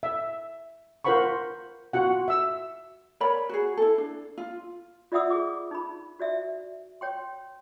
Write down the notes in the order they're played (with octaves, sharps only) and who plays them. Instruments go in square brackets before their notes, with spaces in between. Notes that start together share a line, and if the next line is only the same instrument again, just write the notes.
[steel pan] E5
F4 A#4 C5 F#5 B5 C#6
F4 F#4 F#5
E5 E6
[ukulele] A#4 C#5 D5 B5
F#4 G#4
E4 A4
D4
F4
[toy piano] F4 D5 E5 F#5 D#6 E6
G#4 D6
D#4 B5
F#4 D5 E5
C#5 G5 C6